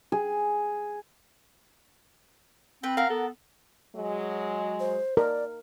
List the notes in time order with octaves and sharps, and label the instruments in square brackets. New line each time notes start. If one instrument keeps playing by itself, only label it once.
[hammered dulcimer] G#4
[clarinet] C4 [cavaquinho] B4 B5 [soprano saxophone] G5
[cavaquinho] A#4 F#5 [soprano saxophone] F5
[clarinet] B3 [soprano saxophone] A4
[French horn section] F#3 G#3
[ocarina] C5
[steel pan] A#4 [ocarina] D5